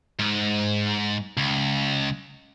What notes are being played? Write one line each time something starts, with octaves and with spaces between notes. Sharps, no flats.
G#2
C#2